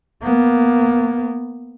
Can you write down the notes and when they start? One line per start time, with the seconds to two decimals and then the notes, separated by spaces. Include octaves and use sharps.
0.23 A#3 B3